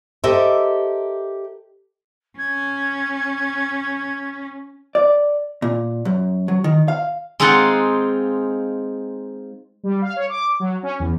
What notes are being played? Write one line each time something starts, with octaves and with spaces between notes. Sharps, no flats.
G4 A4 A#4 C5 D#5 E5
C#4 G#6
D5
A#2
F#2
F#3
D#3
F5
G#3 C4 D#4 F4 F5 F#5
G3
F5
C#5
D6
F#3
C#4
E2